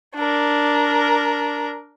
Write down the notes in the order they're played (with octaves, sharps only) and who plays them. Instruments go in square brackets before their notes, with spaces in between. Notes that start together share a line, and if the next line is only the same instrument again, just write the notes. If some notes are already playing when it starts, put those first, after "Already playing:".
[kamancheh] D4 A#4